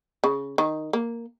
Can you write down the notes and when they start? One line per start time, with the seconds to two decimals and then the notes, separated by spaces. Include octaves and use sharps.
0.24 C#3
0.58 D#3
0.93 A#3